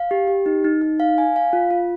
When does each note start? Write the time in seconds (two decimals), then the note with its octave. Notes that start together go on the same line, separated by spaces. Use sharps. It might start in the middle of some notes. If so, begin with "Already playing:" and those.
Already playing: F5
0.11 G4
0.28 G4
0.46 D#4
0.64 D#4
0.81 D#4
1.00 F5
1.18 G#5
1.36 F5
1.53 F4
1.71 F4